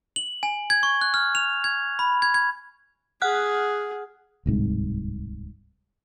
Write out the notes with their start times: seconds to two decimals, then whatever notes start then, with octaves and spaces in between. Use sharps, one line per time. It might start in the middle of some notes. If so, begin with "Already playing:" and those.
0.16 F#7
0.43 G#5
0.70 G#6
0.83 C#6
1.01 F#6
1.14 F6
1.35 F7
1.64 G#6
1.99 B5
2.22 G#6
2.34 G#6
3.22 G#4 F#5 F6 F#6
4.46 D1 C2 G#2